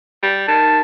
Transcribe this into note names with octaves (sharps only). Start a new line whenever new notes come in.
G3
D#3 A5